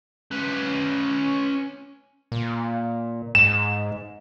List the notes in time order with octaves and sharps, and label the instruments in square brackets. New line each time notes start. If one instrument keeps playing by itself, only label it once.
[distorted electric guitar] C#4 B4
[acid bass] A#2
[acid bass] G#2 [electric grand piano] E7